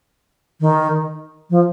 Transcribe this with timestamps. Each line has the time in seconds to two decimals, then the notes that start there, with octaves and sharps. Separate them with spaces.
0.61 D#3
1.50 F3